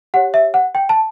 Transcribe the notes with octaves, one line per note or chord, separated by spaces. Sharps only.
G4 C#5 F#5
E5
F#5
G5
A5